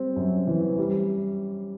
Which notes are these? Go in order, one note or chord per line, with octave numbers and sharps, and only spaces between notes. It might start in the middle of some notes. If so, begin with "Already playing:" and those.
Already playing: G3 C4
F#2
E3
G3